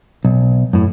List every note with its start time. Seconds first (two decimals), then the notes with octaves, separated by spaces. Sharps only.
0.25 B1
0.73 F#2 A2